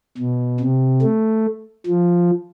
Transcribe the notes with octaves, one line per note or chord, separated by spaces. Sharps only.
B2
C3
A3
F3